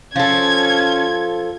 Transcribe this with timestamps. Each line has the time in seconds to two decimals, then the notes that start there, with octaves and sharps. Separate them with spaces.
0.16 F3 C#4 A4 G#6